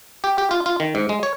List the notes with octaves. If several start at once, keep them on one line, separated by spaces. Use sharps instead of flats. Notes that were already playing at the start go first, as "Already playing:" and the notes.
G4
G4
F4
F4
D#3
G#2
G#3
C#5